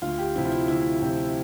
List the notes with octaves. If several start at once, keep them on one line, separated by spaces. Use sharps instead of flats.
D2 F4
G4
C3 F3 C4 E4
F4
E4
D2 E4
C3 F3 C4 G4